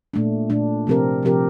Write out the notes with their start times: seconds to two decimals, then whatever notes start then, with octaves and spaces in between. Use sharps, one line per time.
0.14 A#2 A3 D4
0.50 A#2 A3 D4
0.87 C3 F3 C4 G4 A#4
1.23 C3 F3 C4 G4 A#4